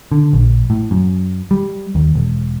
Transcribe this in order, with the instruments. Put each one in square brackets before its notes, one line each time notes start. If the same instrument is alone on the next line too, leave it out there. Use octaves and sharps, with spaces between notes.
[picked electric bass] D3
A#1
A2
F#2
G3
D#2
E1